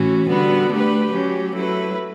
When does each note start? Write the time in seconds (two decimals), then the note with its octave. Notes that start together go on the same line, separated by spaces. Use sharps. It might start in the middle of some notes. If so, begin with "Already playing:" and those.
Already playing: A2 E3 C#4 F#4
0.28 D3 G3 B3 F#4 B4
0.70 A3 D4 G4 B4
1.12 F#3 C#4 G4
1.54 F#3 A3 E4 B4